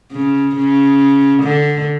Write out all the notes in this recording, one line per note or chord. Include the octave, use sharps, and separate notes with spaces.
C#3
C#3
D3